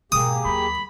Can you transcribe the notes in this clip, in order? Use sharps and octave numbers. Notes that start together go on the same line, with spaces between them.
G#2 B2 A#3 G4 G#4 D#6
D#2 F#3 B5